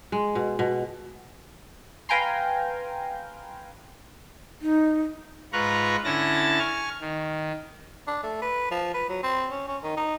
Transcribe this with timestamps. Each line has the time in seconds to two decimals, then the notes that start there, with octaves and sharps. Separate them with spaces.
0.12 G#3
0.35 B2
0.59 B2
2.09 B4 F5 G5 G#5 A#5 C6
4.62 D#4
5.53 G#2 F4 B4 A#5 C#6 F#6
6.05 D3 C#4 E4 A5 A6 A#6
6.59 G#5 C#6 F6
7.01 D#3
8.07 D4
8.23 A3
8.42 B4
8.71 F3
8.94 B4
9.09 F#3
9.23 C4
9.51 C#4
9.68 C#4
9.83 D#3
9.97 D#4